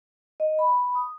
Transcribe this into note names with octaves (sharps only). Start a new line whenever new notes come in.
D#5
B5
D#6